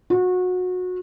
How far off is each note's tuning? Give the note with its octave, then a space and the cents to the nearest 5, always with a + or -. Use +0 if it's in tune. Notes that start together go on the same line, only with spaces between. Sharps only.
F#4 -25